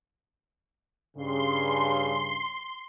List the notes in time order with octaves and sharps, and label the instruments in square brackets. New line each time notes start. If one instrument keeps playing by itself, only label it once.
[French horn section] G2 C#3 [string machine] C6